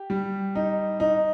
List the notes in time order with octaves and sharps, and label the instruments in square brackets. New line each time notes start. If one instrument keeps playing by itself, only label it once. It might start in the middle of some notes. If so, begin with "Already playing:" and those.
Already playing: [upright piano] G4
G3
D#4
D#4